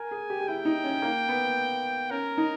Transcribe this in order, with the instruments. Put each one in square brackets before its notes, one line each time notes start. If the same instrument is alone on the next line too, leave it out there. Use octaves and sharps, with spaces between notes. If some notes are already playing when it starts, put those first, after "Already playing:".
Already playing: [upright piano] A#4 [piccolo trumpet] G#5
[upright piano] G#4
G4
G4
[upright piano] E4 [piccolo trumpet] G5
[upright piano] D#4
C#4
A#3
B3
[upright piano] C#4 [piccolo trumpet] A#4
[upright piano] D#4